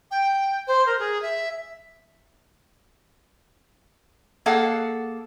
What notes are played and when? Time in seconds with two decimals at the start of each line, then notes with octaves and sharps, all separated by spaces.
0.11 G5
0.67 C5
0.86 A#4
0.99 G#4
1.22 E5
4.46 A#3 G#4 A4 F5 F#5